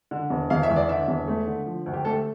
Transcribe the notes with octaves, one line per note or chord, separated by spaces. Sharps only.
D3
E1
E1 F5
E5
E2
D5
D3 E5
E1
A3
D3
F3
D2
G4
A3 A4